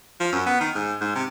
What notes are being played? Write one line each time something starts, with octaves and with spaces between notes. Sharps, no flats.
F3
F#2
B3
D#3
G#2
G#2
C3